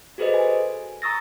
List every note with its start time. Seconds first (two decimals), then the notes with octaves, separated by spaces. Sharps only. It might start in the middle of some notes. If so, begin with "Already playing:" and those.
0.18 F#4 G#4 A4 B4 C5 D#5
0.34 G#5
1.02 A#5 C#6 D#6 E6 A6 A#6